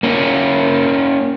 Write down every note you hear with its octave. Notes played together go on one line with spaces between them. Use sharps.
A#3 C#4